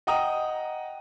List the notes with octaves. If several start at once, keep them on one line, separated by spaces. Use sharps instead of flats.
D#5 F#5 G5 A#5 D#6